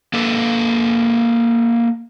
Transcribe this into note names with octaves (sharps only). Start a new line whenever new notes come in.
A#3 A4 B4